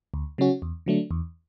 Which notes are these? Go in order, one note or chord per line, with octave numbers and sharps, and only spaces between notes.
D2
C#3 F#3 C#4 F#4
E2
D3 F#3 A3 D4
E2